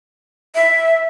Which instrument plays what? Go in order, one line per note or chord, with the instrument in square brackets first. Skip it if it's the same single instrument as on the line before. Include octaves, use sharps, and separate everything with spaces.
[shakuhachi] E5